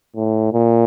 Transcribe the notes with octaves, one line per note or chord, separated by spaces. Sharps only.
A2
A#2